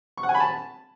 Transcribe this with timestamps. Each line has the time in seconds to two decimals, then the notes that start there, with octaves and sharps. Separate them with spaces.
0.17 C#6
0.23 F#5
0.29 G#5
0.35 B5
0.40 A5